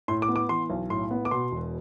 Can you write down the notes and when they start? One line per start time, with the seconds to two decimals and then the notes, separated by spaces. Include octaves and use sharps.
0.08 A2 C6
0.22 D6
0.29 B3
0.36 D6
0.49 E3 C6
0.70 B1
0.90 A2 C6
1.11 B3
1.25 D6
1.31 B2 C6
1.52 E1